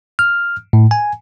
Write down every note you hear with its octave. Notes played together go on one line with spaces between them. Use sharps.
F6
A2
G#5